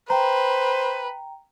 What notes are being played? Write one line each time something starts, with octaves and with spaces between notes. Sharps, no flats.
B4 C5 G5 A#5